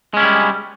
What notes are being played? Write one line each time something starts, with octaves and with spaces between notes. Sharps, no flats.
G3 G#3 C#4 E4